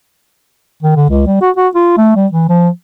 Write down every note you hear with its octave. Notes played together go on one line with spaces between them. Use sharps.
D#3
D3
C#2
G3
F#4
F#4
F4
A3
G3
E3
F3